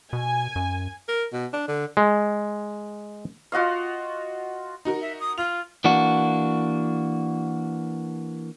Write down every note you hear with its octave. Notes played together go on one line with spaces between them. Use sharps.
B2 G#5
F#2
A#4
B2
D4
D3
G#3
F4 F#4 D#5 F5
D#4 F#4 A#4
E5
D#6
F4 F7
E3 A#3 D4 F#4